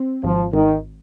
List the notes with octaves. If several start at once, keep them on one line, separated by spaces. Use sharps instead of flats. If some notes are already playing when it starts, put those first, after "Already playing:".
Already playing: C4
G#1 F3
G#1 D#3